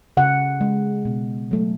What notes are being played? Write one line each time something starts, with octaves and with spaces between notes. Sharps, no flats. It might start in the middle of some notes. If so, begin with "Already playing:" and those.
C#3 F#5
G#3
B2
F#3 A3